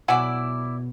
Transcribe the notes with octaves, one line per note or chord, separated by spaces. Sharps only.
B2 F#3 E4 D5 F#5 G#5